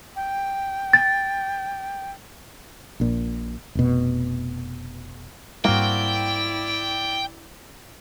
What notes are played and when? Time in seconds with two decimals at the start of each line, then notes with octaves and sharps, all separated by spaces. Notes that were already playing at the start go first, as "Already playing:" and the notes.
0.16 G5
0.93 A6
3.00 A#1 A#2
3.75 F1 B2
5.65 G#2 G3 A#3 C4 E4 F#4 D5 G5